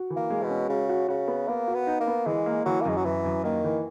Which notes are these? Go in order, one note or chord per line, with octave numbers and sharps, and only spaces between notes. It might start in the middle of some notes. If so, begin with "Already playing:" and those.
Already playing: F#4
E3
A#3
G#3
B2
C#4
C#3 F#4
F#4
C#3 F#4
B3
A#3 B3
F#4
B3
D#4
A#3
B3
E3 G#3
A#3
E3 F#3
A#3
F#2 G#3
F#3
F#2 E3
F#2
D#3 A#3
E3